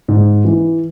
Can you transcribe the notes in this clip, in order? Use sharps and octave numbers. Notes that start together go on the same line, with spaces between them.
G#2
E3